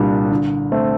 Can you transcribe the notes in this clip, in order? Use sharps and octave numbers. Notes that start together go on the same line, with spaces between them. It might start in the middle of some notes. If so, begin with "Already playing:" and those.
Already playing: C2 A#2 G3 D4
D3
A3 C4